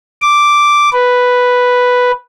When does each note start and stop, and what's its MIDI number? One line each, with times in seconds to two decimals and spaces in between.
0.22 0.89 86
0.93 2.11 71